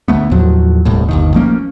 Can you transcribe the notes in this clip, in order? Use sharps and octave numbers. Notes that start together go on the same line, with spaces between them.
D2 A3 B3
D#2 A2 F3 F#3
D#1 C2 A2
G1 D#2 D#3
F3 A3 A#3 C#4